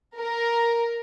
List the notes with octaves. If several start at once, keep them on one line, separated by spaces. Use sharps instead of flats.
A#4